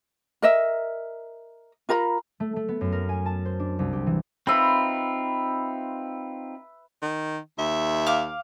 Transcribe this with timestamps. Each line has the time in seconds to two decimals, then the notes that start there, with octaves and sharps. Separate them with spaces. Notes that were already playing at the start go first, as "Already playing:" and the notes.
0.42 A#4 D#5 E5
1.89 F4 A#4 A#5 B5
2.40 A3
2.56 A3
2.68 B3
2.81 F#2
2.92 A#4
3.09 G#5
3.26 A5
3.45 C5
3.60 D4
3.79 C2
3.93 G4
4.07 E3
4.47 C4 D#4 F4 B4 E5 B5
7.02 D#3
7.58 D#2 E5
8.07 F5 D6